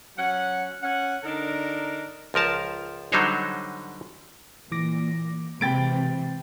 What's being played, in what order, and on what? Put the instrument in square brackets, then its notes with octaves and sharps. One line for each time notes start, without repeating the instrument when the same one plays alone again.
[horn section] F#3 C#4 F#5
C#4 F#5
D3 D4 D#4 A#4
[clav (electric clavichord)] C#2 F3 A#4 A5
D3 F#3 G3 D#4 C5 C#5
[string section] A#2 [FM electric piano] E3 D6 A#6
[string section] C3 E3 [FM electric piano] G#3 B5 [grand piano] G5 A6 D7